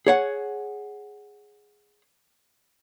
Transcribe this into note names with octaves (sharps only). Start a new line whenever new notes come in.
G#4 C#5 F#5